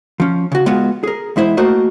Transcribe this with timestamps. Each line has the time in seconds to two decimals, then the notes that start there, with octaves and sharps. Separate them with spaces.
0.20 F3 C#4
0.52 C#3 F#4
0.66 G#3 B3 F4 F#4
1.04 G#4 A#4
1.36 E2 G#3 E4 C5
1.57 A3 A#3 F#4 A#4 C5 D#5